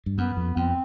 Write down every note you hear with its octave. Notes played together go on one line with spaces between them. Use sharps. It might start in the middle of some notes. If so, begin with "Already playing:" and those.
G2
F#2 B3
F2
F2 C4